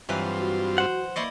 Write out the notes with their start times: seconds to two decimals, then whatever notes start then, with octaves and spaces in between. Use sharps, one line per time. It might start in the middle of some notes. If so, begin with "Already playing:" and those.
0.09 G2 E3 F#3 C4 F4 B4
0.38 F#4
0.78 C5 F#5
1.16 A#3 E4 C5 D5 D#5 C#6